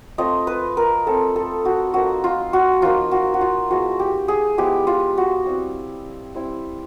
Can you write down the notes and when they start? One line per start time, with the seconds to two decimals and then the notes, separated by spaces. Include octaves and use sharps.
0.18 A3 C4 F4 D#5
0.47 B4
0.77 A#4
1.06 A3 C4 F4 A4
1.36 A4
1.65 F#4
1.94 F3 A#3 D#4 F#4
2.24 F4
2.53 F#4
2.82 F3 A#3 D#4 F4
3.11 F#4
3.34 F#4
3.41 F4
3.70 F3 G#3 B3 E4 F#4
4.00 G4
4.28 G#4
4.58 F3 G#3 B3 E4 G4
4.87 F4
5.17 F#4
5.46 G3 C4 E4
6.35 G3 C4 E4